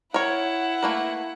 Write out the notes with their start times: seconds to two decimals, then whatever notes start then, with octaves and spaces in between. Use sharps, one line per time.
0.14 E4 A#4 C#5 F#5
0.83 A3 A#3 B4